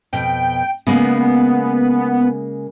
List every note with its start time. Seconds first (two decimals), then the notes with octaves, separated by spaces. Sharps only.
0.13 F2 B2 G5
0.87 C#3 G#3 A#3 B3